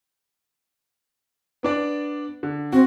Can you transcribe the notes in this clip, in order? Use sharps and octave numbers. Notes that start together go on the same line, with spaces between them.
B3 D4 D5
D3
C4 F#4